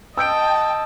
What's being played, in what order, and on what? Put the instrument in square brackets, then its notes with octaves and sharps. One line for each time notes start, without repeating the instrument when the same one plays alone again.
[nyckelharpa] D#5 A5 [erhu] G5 [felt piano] E6 G6 D7